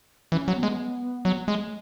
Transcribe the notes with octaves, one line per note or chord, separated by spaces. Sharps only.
E3 C#4
F#3
B3
G#3
F#3
G#3
A3